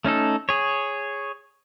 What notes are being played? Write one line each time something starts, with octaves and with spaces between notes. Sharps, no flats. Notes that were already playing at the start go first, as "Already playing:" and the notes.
A3 C#4 D#4 A4
G#4 C#5